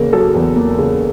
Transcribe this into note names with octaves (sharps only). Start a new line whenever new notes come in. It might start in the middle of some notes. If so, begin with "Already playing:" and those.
Already playing: E2 C#3 A#3 A#4
F#3 A4
E2
A#3
C#3